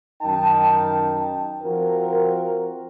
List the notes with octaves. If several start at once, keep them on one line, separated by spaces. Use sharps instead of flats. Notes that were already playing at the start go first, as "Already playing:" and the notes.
F#2 D#3 D#4 A#4 G5 A5
F3 C4 F4 F#4 A#4